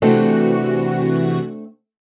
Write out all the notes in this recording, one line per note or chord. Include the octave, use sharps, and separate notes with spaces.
C3 E3 A3 C4 D4 F#4